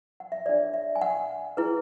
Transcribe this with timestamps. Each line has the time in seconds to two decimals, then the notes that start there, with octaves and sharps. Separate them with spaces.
0.20 F#5
0.32 E5
0.46 D4 G#4 C#5 D5
0.74 E5
0.96 G#5
1.02 F#5
1.57 E4 G#4 B4